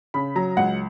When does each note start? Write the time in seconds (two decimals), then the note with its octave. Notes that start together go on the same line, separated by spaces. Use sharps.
0.14 C#3 B5
0.36 F#3 A#5
0.57 C#2 F#5